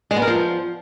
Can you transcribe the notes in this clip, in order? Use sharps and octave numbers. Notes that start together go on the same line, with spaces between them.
G#3
B3
A#4
F3